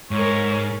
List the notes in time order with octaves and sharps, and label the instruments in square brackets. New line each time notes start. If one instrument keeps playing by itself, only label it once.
[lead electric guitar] G#2 [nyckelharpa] A#4 C#5